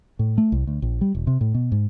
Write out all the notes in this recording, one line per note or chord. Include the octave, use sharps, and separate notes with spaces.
A2
A3
C2
D2
A#1
G3
E1
C3
A2
B2
G#2